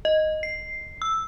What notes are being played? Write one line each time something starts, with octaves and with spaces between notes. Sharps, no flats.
D#5
C7
E6